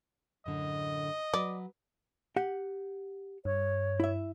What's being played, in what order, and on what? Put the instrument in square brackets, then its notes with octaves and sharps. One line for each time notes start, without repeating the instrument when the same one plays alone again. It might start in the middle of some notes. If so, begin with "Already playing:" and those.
[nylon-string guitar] F#2 A2 D3 [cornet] D#5
[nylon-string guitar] F#3 B4 [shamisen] D5
[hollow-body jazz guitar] G4 F#5
[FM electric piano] G2 [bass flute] C#5
[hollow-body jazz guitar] E4 E5